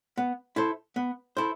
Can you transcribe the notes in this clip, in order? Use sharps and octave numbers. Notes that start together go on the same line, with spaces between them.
B3
E4 A4 C5
B3
E4 A4 C5